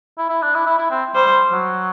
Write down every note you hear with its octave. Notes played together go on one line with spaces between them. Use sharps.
E4
E4
D4
E4
E4
E4
C4
G3 C5
G3
F#3